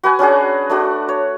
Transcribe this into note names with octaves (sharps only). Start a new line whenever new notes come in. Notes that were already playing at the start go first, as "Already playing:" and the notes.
F#4 B4 G#5
C#4 D4 F#4 G#4
A3 D4 F#4
C#5